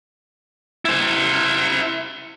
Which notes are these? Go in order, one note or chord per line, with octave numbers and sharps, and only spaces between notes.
E4 C5